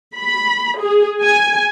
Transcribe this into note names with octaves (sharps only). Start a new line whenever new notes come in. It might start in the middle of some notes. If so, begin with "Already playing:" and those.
B5
G#4
G#5